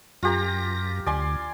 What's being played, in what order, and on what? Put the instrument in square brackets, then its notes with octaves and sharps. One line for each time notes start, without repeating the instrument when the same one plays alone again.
[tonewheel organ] F#2 A#6 [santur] F4 G4 A#5
[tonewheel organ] D2 [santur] D5 G#5 C6